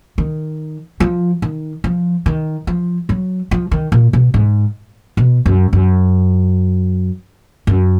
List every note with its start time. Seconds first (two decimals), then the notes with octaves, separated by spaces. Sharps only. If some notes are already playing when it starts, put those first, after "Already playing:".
0.18 D#3
1.00 F3
1.42 D#3
1.84 F3
2.26 D#3
2.67 F3
3.09 F#3
3.51 F3
3.72 D#3
3.92 A#2
4.13 B2
4.34 G#2
5.17 B2
5.46 F#2
5.73 F#2
7.67 F#2